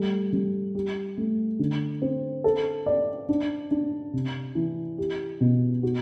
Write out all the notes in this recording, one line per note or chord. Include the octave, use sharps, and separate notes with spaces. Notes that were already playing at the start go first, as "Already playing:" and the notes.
Already playing: G3 A3
G3
G4
A3
D3
C4
A4
D5
D4
D4
C3
E3
G4
B2
F#4